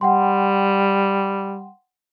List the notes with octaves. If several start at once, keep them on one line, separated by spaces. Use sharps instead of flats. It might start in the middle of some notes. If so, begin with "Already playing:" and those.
G3 F#5 G5 C6